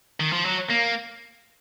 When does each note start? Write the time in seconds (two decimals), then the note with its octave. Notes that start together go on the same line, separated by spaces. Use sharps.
0.20 D#3
0.32 F3
0.45 F#3
0.70 A#3